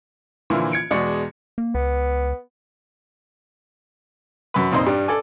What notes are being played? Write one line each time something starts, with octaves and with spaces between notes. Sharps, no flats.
A#2 D3 E3 F3 A#3 E4
G#6 C#7 D7
E2 B2 G#3 D5 C#6 C#7
A#3
C#2 B3
F#2 B4
F2 A#2 D#4 C5 D#5
G2 G3
A4 D5 G#5